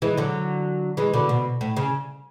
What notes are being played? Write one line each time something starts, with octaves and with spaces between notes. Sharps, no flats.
E3 G#3
D3 F#3
E3 G#3
B2 D3
B2
A2
C#3